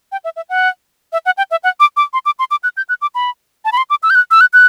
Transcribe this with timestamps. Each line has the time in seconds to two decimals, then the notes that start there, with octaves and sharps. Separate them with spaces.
0.12 G5
0.24 E5
0.36 E5
0.49 F#5
1.13 E5
1.26 F#5
1.37 G5
1.51 E5
1.64 F#5
1.80 D6
1.97 D6
2.13 C6
2.26 D6
2.39 C6
2.51 D6
2.63 F#6
2.77 G6
2.89 F#6
3.02 D6
3.15 B5
3.65 A5
3.72 B5
3.77 C6
3.90 D6
4.03 E6
4.10 G6
4.15 F#6
4.31 E6
4.41 F#6
4.53 F#6